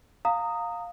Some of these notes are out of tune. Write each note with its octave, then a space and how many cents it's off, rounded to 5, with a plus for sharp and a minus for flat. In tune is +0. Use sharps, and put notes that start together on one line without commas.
F5 +15 A#5 -20 D#6 +0